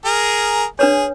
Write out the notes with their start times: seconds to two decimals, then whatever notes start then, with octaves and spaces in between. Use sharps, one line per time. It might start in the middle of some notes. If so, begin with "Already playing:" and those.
0.05 G#4 A#4
0.79 D4 G#4 B4 C#5